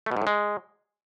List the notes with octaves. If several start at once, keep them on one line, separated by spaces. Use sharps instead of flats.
A3
B2
G#2
A2
G#3